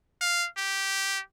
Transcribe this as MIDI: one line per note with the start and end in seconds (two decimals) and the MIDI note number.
0.21 0.48 77
0.57 1.21 67